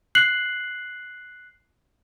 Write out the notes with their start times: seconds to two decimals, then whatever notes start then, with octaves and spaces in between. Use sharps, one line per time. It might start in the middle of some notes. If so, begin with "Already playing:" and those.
0.15 F#6 C7 F#7